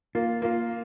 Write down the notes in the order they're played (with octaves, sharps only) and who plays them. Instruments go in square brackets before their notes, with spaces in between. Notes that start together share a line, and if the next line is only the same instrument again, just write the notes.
[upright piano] A#3 [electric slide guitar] F4
[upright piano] A#3 [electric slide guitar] F4